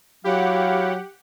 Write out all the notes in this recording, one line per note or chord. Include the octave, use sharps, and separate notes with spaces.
F#3 E4 G4 F5 F#5